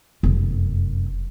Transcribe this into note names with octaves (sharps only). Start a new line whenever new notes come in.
F1 F#2